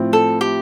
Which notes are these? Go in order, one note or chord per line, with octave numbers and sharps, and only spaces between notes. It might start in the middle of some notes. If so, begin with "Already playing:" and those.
Already playing: A2 F3 C4
A4
G4